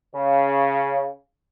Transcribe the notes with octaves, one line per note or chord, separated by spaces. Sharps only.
C#3